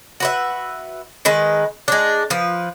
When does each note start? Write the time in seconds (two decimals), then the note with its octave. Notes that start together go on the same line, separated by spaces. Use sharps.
0.20 F#4 B4 E5
1.25 D#3 G#3 B4
1.88 G#3 D4
2.30 F3 B4